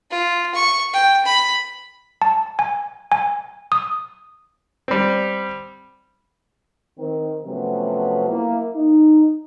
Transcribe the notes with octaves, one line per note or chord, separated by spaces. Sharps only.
F4
C#6
G5
B5
A5
G#5
G#5
D#6
G3 C4
D#3 C4
C3 F3 F#3 A3 B3 C#4
A#3 E4
D#4